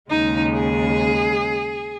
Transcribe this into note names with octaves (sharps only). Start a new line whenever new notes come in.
D#2 C#3 G#3 D#4
G#4